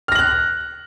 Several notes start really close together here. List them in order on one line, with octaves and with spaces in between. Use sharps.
F6 A#6 F#7 F#6